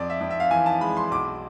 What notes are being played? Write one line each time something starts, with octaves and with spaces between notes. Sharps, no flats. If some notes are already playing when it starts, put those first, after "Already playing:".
Already playing: F2 D5
E5
F2
E5
F5
E3 G#5
A5
G#3 B5
C6
B1 D6